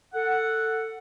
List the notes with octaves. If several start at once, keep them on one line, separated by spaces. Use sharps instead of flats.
A4 F#5